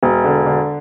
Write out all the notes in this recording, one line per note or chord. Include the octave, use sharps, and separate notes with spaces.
E1
D3
D3